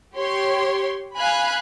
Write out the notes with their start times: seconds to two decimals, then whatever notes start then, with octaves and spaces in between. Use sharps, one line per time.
0.15 G4 C#5 C6
1.17 F5 G#5 B5 F#6